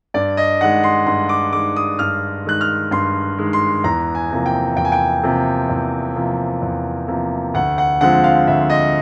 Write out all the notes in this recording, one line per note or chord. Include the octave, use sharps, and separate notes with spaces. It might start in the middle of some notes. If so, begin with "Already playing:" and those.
G2 D5
D#5
D#3 G#3 F#5
C6
G2 C6
D6
D#3 G#3 D6
D#6
G2 F6
D#3 G#3 F#6
F6
G2 C6
D#3 G#3
C6
E2 A#5
G#5
C3 F3 A#3
G5
E2 G5
G#5
G5
C3 F3 A#3
E2
C3 F3 A#3
E2
C3 F3 A#3
D2 F#5
F#5
D3 F3 G#3 C4 F#5
F5
D2 E5
D#5